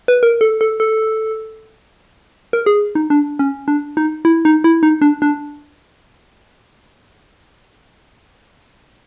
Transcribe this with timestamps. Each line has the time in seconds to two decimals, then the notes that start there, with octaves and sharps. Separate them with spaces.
0.08 B4
0.23 A#4
0.41 A4
0.61 A4
0.80 A4
2.53 A#4
2.66 G#4
2.95 D#4
3.10 D4
3.39 C#4
3.68 D4
3.97 D#4
4.25 E4
4.45 D#4
4.64 E4
4.83 D#4
5.02 D4
5.22 D4